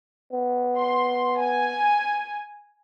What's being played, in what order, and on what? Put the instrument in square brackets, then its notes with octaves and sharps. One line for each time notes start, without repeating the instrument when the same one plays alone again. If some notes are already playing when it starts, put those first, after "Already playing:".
[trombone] B3
[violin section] C6
G#5